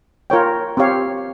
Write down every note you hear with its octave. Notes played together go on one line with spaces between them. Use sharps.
F4 A#4 C#5 G5
C4 G4 C#5 F5